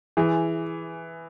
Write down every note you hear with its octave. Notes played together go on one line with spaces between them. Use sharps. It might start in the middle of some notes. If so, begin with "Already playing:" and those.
E3 G#4